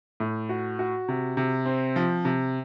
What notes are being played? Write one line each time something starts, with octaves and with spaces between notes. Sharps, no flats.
A2
F#4
F#4
C3
C3
C4
F3
C3